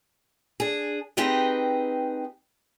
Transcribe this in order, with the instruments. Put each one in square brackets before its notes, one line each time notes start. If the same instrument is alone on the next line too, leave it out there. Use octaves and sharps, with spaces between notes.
[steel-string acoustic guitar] D4 G#4
C4 D#4 G4 G#4 B4 D#5